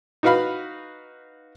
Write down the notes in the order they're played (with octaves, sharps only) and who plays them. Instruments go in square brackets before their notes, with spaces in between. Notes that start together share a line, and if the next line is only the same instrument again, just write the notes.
[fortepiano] D#4 F#4 B4 F5 B5